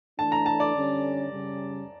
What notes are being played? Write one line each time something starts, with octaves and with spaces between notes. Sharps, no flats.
E3 A3 D4 A5
A#5
A5
D5
D3 G3 C#4
C#3 G3 C#4